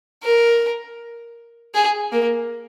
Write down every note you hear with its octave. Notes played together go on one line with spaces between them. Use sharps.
A#4
G#4
A#3